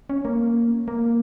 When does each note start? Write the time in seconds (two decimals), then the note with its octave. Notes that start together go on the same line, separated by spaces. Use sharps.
0.10 C#4
0.25 A#3
0.88 A#3